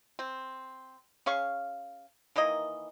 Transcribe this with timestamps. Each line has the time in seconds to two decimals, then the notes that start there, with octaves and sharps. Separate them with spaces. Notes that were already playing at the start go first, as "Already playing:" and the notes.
0.19 C4
1.26 C#4 G#4 F5 C#6
2.36 D#3 E3 A#3 D#5